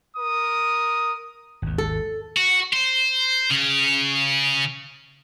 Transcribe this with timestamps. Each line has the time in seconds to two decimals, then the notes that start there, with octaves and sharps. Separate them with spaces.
0.17 A#4 D#6
1.62 G#1 D#2
1.78 A4
2.37 F#4
2.73 C5
3.50 C#3